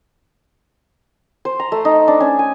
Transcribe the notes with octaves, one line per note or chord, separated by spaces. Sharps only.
C5
A#5
A3
D#4
D4
C#4
G#5